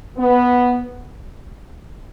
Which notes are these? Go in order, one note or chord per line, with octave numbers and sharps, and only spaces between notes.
B3